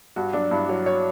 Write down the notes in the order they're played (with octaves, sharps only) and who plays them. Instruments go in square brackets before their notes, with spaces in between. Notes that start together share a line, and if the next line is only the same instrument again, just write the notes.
[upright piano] G2 F#4
F#3 D4
G2 E4
F#3 C#5
C#5